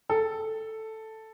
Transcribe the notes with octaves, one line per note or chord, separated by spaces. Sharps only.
A4